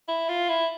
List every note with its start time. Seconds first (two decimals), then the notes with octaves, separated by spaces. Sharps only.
0.08 E4
0.29 F4
0.49 E4